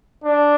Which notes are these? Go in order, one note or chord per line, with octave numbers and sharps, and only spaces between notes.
D4